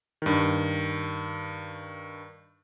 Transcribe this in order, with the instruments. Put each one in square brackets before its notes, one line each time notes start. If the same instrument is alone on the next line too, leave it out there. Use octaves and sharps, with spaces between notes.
[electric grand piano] G2 D#3